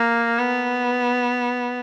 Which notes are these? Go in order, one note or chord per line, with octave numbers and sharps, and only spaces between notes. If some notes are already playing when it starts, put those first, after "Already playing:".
Already playing: A#3
B3